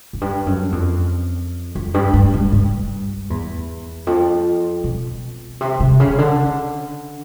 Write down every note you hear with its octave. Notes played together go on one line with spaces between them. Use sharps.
F#2
G2
F#2
F2
F2
G2
G2
G#2
G2
E2
F2
B2
C3
C3
C#3
D3